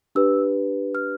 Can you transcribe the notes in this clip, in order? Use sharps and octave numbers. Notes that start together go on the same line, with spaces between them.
D4 G4 B4 E6
F6